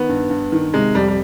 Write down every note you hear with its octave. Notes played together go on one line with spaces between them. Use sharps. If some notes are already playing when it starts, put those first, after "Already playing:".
Already playing: D#3 B3
G2
G2
D#3
C3 G#3
F2 G3
G3